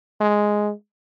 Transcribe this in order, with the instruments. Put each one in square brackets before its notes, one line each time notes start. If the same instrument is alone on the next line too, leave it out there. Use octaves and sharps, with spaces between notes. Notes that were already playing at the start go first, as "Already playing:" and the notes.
[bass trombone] G#3